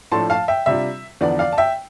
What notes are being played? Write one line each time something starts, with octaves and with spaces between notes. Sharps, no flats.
A2 F3 A3 D4 A5 C6
F5 A5
E5 G5
C3 G3 D4 F4 E5
E2 D3 F3 B3 D4 D5
D5 F5
A5
E5 G5